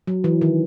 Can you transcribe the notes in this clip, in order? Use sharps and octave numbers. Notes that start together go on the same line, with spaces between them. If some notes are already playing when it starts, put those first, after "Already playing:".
F#3
E3
D#3